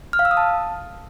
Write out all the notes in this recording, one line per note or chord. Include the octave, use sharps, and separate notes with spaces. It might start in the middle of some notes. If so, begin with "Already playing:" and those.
F6
F5
E6
D#6
A5